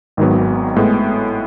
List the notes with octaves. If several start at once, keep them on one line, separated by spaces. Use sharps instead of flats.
G#1 G#2 D#3 F#3 B3
A2 G#3 B3